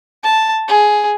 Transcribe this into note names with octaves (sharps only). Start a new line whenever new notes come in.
A5
G#4